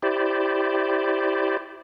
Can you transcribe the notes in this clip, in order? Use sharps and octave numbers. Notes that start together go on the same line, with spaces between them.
E4 G4 C5 D5